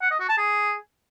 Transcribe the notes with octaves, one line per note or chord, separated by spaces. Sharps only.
F#5
D#5
F#4
A5
G#4